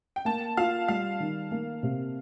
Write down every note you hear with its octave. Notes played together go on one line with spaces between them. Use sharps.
G5
A#3 A5
F4 F5
G3 F5
D#3
A#3
C3